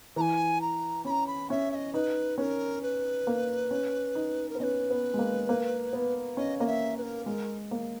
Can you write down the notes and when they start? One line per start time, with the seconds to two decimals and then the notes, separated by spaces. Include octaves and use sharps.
0.16 E3 A#5
0.21 G#5
0.61 A#5
1.05 C#4 B5
1.10 A#5
1.27 B5
1.50 C#4 E5
1.71 E5
1.75 D#5
1.93 D#4 B4
2.38 C#4 A#4 B4
2.82 B4
3.27 A#3
3.71 C#4
4.15 D#4
4.49 A#4
4.55 B3
4.60 C#4 B4 D#5
4.90 B3
5.14 G#3
5.19 A#3
5.49 A#3
5.93 B3
6.37 C#4 D#5
6.59 A#3 D#5
6.67 E5
6.97 B4
7.02 A#4
7.26 G#3 A#4
7.71 A#3